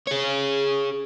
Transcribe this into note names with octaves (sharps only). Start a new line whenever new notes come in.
G#4 C#5